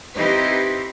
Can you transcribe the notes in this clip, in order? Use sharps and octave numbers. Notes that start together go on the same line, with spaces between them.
C4 D#4 E4 G4 B4 C5